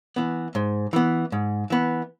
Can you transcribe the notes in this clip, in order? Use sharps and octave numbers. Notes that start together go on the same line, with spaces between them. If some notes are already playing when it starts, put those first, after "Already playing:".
E3 B3
G#2
E3 B3
G#2
E3 B3